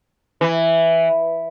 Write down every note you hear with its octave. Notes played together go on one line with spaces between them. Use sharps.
E3